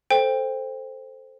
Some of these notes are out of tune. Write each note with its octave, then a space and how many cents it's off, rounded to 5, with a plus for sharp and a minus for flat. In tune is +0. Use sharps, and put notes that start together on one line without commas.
A4 +0 C5 +0 G5 +20